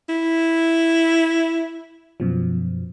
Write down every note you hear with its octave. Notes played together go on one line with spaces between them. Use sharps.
E4
F#2 B2 F3